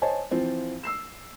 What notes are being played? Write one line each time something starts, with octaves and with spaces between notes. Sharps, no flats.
C5 C#5 D#5 G#5 A5
E3 F3 C4 F4
E6 C7 E7